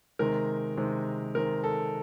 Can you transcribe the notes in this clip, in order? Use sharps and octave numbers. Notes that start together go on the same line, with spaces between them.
C3 D#3 G#3 A#4
C3 D#3 G#3
C3 D#3 G#3 A#4
A4